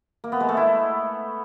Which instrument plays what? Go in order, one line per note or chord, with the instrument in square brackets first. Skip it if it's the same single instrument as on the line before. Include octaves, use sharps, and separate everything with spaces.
[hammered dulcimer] A#3
B3
G#3
A3
E4